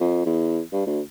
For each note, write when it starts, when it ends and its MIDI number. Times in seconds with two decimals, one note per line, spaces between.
0.01 0.24 41
0.26 0.61 40
0.73 0.82 43
0.87 1.01 38